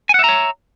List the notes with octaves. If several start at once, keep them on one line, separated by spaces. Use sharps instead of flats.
C#5 E5 F#5 G#5 A#5